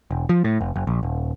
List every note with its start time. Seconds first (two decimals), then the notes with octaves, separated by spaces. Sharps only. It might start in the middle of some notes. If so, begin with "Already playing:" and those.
0.11 E1
0.29 F3
0.44 A2
0.61 F1
0.76 F#1
0.87 A#1
1.03 D#1